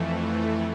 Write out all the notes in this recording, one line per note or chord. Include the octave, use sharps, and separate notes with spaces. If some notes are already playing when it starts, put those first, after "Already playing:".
Already playing: F2 E3 A3